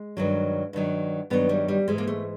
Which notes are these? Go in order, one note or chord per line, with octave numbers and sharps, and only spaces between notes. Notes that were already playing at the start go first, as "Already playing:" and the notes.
Already playing: G#3
G2 D#3 F#3
G2 D#3 F#3
G2 D#3 F#3 B3
G3
G3
G#2 E3 G#3
A#3
A3